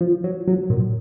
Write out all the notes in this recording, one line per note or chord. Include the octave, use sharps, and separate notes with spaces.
F3
F#3
F#3
A#2